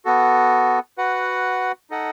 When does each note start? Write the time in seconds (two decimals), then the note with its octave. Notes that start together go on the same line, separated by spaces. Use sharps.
0.05 B3 F#4 A4
0.98 F#4 B4 F#5
1.90 D#4 A4 D#5 F#5